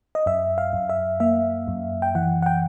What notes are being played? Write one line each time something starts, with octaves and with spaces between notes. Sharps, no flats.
D#5
F#2 E5
F5
F#2
E5
A#3 E5
F#2
G5
E3 F#5
F#5
G5